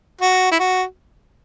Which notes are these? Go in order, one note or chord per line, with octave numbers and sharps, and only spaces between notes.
F#4
E4
F#4